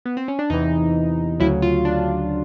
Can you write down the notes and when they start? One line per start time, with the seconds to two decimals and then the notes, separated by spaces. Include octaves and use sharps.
0.06 B3
0.17 C4
0.28 C#4
0.39 D4
0.50 E2 C3 E3 D#4
1.40 D2 C#3 F#3 E4
1.62 F4
1.85 D4